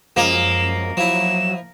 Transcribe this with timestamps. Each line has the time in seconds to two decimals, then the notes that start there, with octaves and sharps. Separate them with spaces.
0.16 F#2 F3 G#3 A#3 A#4 E7
0.97 F3 F#3 E4 E7